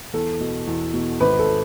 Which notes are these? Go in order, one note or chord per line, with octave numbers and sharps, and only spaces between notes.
E2 A4
B2
E2
B2
G#1 B4
A4